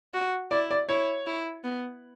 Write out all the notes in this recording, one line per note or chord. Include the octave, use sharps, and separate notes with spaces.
F#4
E4 D5
D5
E4 C#5
E4
B3